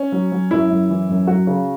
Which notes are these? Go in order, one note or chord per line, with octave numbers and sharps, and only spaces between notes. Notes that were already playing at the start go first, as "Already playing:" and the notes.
Already playing: C#4
F#3
F#3
F#2 E4
F#2
E3
F#2
F#3 F#4
C#3